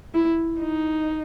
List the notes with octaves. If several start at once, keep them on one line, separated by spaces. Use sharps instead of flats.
E4
D#4